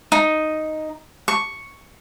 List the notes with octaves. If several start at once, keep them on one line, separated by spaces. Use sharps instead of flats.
D#4
C#6